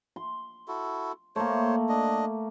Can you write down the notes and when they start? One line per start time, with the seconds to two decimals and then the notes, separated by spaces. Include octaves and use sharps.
0.16 C6
0.68 E4 F#4 A4
1.36 A3 A#3 C5 C#5
1.89 D4 D#5